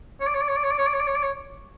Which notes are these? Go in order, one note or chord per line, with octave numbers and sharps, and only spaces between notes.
C#5
D5
C#5
D5
C#5
D5
C#5
D5
C#5
D5
C#5
D5
C#5
D5
C#5